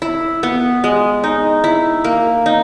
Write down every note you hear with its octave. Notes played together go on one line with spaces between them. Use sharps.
E4
B3
G#3
D#4
E4
A#3
D#4